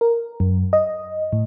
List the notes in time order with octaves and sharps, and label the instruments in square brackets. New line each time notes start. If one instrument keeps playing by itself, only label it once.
[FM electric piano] A#4
F#2
D#5
A2